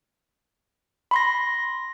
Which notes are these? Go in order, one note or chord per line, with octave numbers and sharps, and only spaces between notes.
B5 C6 A#6